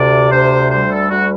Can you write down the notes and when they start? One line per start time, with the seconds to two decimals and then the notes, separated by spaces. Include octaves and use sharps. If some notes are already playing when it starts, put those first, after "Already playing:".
Already playing: D2 C3 D5
0.31 D2 C5
0.71 G3 C5
0.91 A4
1.10 D2 F#4